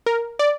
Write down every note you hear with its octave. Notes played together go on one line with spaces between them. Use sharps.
A#4
D5